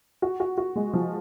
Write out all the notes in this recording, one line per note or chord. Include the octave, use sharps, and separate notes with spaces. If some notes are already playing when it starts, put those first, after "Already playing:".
F#4
F#4
F#4
G#3
F3